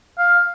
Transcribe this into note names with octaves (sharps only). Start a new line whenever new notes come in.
F5